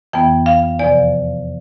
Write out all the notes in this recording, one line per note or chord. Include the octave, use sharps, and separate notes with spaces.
F2 E3 B3 G5
F5
E2 C3 F3 D5